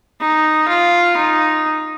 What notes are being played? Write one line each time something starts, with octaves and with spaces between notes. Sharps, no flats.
D#4
F4
D#4